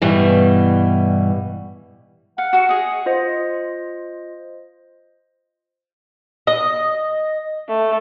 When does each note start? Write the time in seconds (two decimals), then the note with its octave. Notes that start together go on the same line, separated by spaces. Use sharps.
0.01 G2 B2 E3 G3
2.38 F5 F#5
2.53 F#4 A4
2.69 G#4 D#5
3.06 F4 C5 D#5
6.47 D#5
7.69 A3